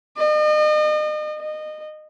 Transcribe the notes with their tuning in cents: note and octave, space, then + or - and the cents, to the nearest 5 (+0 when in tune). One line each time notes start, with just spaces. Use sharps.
D#5 -40
D#5 -25